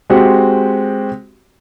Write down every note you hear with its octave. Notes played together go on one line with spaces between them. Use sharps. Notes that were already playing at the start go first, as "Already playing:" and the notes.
G#3 C4 F#4 G4